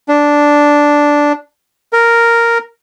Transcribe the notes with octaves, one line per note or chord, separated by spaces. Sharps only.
D4
A#4